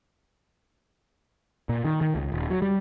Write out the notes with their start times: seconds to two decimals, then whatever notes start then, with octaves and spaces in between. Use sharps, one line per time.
1.69 A#2
1.85 D#3
2.01 D#3
2.15 C#2
2.32 D#1
2.50 F#3
2.62 G3